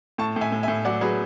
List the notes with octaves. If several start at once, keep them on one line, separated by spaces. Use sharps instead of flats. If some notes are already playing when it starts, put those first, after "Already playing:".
A2 A5 C#6
A2
E5 G#5
A2
E5 G#5
A2
F#3 D5 F#5
F#3 G#4 B4